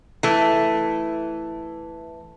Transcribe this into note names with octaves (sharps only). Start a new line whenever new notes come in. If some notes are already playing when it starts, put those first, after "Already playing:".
E3 A3